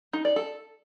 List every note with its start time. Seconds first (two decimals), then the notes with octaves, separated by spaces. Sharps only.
0.13 D#4
0.25 D5
0.36 A4